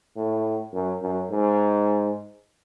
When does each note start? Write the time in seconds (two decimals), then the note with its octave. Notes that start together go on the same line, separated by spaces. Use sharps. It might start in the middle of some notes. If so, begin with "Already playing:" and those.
0.16 A2
0.74 F#2
1.02 F#2
1.31 G#2